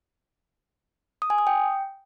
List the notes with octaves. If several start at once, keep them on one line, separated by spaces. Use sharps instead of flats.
D#6
G#5
D#6
G5